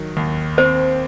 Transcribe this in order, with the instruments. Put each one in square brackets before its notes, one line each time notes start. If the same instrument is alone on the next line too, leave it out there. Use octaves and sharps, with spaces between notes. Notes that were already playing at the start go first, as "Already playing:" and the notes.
Already playing: [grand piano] D#3 F#3
D#2
[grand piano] C4 [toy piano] C5